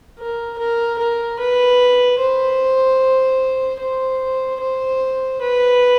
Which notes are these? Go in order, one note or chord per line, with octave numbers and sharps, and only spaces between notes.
A#4
A#4
A#4
B4
C5
C5
C5
B4